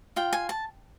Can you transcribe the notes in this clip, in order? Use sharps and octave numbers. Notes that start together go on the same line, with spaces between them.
F4 G5
G#5
A5